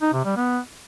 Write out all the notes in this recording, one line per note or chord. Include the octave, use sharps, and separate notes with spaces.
D#4
C3
G3
B3